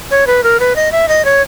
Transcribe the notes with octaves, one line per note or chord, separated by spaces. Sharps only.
C#5
B4
A#4
B4
D#5
E5
D#5
C#5